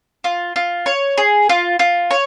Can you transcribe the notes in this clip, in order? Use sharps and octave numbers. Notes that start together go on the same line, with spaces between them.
F4
F4
C#5
G#4
F4
F4
C#5